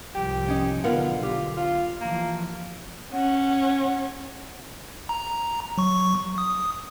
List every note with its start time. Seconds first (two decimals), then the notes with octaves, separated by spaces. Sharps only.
0.15 C2 G#2 F3 G4
0.48 C#4 D#4
0.84 B1 D3 B3 F4 A#4 F#5
1.23 F4 G4
1.57 F4
2.01 E3 F3 A#3
3.13 C#4 F#5
5.09 A#5
5.78 F#3 C#6
6.38 D#6